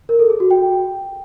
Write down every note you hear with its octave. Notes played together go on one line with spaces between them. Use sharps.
A#4
A4
G#4
F#4
G5